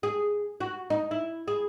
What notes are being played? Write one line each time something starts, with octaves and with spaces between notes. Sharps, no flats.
G#4
F#4
D#4
E4
G#4